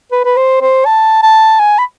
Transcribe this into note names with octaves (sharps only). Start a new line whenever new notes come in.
B4
B4
C5
C5
A5
A5
G#5
B5